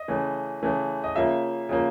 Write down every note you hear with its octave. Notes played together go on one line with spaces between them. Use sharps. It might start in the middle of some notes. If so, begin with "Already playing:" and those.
Already playing: D#5
C#3 E3 A3
C#3 E3 A3
D#5
C#3 F3 A#3 E5
C#3 F3 A#3